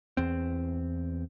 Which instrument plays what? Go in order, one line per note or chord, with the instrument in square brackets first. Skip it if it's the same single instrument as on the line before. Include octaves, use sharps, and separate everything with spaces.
[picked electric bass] E2 C4